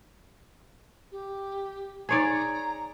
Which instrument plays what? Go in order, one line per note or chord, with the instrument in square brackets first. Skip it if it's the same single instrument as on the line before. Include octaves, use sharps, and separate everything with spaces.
[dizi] G4
[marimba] D#4 G#6 [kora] G#4 C#5 D5 [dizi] A#5